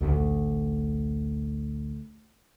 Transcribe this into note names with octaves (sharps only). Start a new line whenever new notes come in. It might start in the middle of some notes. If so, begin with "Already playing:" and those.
A1 D2